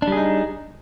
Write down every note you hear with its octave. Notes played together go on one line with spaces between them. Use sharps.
G3 D4 D#4 G#4